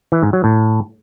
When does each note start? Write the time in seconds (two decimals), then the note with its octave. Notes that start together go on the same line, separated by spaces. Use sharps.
0.12 E3
0.23 G#2
0.33 F#3
0.44 A2